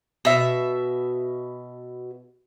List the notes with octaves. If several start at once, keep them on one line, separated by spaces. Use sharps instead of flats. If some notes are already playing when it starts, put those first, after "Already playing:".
B2 E5